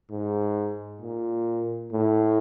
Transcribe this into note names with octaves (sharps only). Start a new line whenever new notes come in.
G#2
A#2
A2